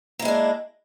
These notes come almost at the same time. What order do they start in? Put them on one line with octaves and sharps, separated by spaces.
A#3 E4 G#3 D4